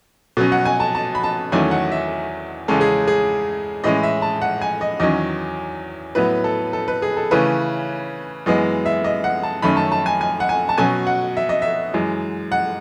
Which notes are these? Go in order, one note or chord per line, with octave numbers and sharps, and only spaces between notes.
B2 F#3 C#4
F#5
G#5
A5
A5
B5
A5
E2 D#3 F#3 A3 C#4 G#5
F#5
E5
E2 C#3 G#3 C#4 A4
G#4
G#4
A2 E3 G#3 C#4 D#5
E5
A5
F#5
G#5
D#5
E2 D#3 F#3 C#4 D#5
A2 F#3 B3 B4
A4
A4
B4
G#4
A4
C#3 E3 A3 C#4 B4
F#2 E3 G#3 B3 D#5
E5
D#5
F#5
A5
F#2 D#3 A3 C#4 B5
A5
A5
G#5
G#5
F#5
G#5
A5
B2 F#3 C#4 G#5
F#5
E5
D#5
E5
F#2 E3 G#3
F#5